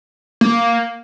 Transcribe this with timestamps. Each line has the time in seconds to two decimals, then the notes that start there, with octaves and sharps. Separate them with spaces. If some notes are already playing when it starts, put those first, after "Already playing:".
0.41 A#3